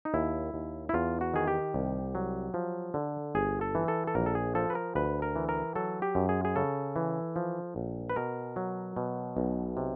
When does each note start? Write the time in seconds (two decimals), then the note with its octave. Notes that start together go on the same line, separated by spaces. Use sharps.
0.05 D#4
0.14 D#2 E4
0.54 D#2
0.89 E4
0.94 E2 F4
1.21 F#4
1.34 D#3 G#4
1.48 G4
1.74 C2
2.15 F#3
2.54 F3
2.94 D3
3.35 G1 G#4
3.61 A4
3.75 E3
3.88 A4
4.07 A4
4.15 A#1 A#4
4.26 A4
4.35 G#4
4.55 F3 A4
4.70 B4
4.75 A#4
4.95 D2 B4
5.22 A#4
5.36 E3
5.49 A#4
5.75 F#3 A4
6.02 G4
6.15 F#2
6.29 G#4
6.45 G#4
6.56 C#3 A4
6.96 E3
7.36 F3
7.76 A#1
8.10 B4
8.16 B2 A#4
8.56 F#3
8.96 B2
9.37 B1
9.77 C3